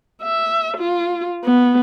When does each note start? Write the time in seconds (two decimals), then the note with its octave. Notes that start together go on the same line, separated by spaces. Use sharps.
0.23 E5
0.77 F4
1.45 B3